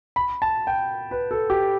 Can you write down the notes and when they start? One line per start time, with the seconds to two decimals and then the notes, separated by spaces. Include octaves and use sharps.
0.16 B5
0.42 A5
0.67 G5
1.11 B4
1.31 A4
1.50 G4